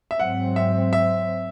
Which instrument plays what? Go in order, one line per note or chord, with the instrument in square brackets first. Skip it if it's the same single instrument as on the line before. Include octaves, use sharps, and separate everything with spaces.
[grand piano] E5
[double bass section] G#2 F#3 C4 [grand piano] F#5
[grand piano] E5
E5